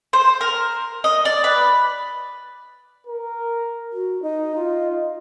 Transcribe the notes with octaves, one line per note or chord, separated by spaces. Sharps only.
C5
A#4
D#5
D5
B4
A#4
F#4
D#4 D#5
F4